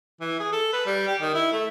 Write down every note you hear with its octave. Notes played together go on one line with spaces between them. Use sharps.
E3
G#4
A4
B4
G3
G4
D#3
E4
A3